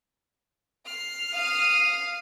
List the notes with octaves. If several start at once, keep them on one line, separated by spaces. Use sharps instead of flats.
F6 C7
F5 D#6